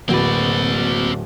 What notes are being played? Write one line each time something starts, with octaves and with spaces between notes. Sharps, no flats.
D1 A#3 C4 F#4 B4 D5